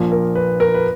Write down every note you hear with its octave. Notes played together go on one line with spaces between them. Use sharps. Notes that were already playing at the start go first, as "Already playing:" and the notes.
Already playing: A#1 A#2 F3 A#3
A#4
B4
A#4
B4